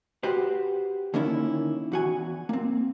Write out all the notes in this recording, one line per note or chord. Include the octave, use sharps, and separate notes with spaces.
F#4 G4 B4 C5
D3 D#3 A#3 C#4 E4
E2 F#4 G#5
A#3 C4